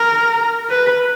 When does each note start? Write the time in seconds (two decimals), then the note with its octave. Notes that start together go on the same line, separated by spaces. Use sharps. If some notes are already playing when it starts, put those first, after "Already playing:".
Already playing: A#4
0.69 B4